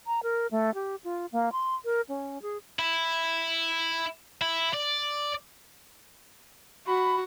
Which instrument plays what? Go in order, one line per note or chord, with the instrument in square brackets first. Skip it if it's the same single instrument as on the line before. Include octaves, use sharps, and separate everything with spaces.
[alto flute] A#5
A#4
A3
G4
F4
A#3
C6
A#4
C#4
G#4
[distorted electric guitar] E4
E4
D5
[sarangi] F#4 [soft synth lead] B5